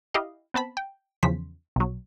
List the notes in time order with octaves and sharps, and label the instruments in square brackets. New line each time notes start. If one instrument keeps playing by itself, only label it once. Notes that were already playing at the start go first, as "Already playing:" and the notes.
[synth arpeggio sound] E4 G4 D#5 F5
B3 C4 A5 B5
G5
E2 C#3 F3 C5 B6
B1 F#3